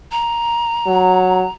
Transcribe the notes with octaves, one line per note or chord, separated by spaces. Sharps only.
A#5
F#3